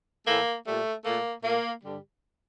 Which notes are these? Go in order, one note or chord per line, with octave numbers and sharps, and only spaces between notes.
A2 E3 A3 A#3
A#2 G3 A3
A#2 A3 A#3
A#2 A3 A#3
G2 D3 G3